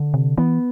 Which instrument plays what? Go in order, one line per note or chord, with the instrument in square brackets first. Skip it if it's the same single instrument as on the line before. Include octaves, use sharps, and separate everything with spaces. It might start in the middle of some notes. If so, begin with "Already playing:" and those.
Already playing: [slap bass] D3
[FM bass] C3
[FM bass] E3 [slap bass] B3